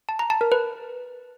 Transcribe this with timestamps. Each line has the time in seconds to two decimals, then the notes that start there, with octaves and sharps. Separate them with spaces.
0.09 A5
0.19 A#5
0.30 A5
0.41 A#4
0.52 B4